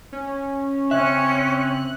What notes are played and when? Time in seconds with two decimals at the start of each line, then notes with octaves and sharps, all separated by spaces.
0.12 C#4
0.91 C#3 C4 C#4 E5 F#6